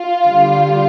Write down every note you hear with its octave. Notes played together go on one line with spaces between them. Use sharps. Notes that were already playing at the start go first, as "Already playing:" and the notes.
Already playing: F4
D3 G3